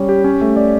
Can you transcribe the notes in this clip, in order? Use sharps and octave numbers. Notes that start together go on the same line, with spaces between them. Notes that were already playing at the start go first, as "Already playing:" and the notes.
Already playing: G3 C#4 C#5
G4
C#4
A3
D5